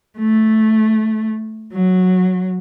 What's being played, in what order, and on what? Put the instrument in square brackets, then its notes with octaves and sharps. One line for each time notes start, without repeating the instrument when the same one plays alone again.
[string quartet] A3
F#3